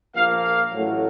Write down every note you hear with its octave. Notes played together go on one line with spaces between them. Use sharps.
A#1 A#2 F3 A#3 F5
F5
A1 A2 F#3 A3